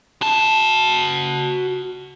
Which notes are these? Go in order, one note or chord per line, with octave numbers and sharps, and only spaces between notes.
F#4 A5